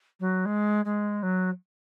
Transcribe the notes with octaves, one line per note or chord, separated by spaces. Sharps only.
F#3
G#3
G#3
F#3